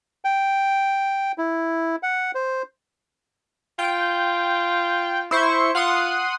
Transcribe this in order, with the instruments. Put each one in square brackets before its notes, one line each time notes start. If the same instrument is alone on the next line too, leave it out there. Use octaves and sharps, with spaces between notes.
[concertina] G5
E4
F#5
C5
[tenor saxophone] F4 [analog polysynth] G5
[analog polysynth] E4 C5 C#6
[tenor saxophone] F4 [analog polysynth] F#5 C6 D#6